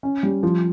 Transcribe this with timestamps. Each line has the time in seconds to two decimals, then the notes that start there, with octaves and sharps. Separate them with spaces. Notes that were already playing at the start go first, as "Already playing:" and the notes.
0.03 C#4
0.23 G3
0.43 F3